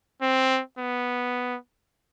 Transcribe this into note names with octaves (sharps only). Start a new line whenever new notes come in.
C4
B3